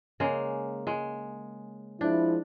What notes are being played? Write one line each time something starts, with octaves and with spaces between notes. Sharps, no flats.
C#3 G#3 A#3
G#3
F3 G#3 D4 E4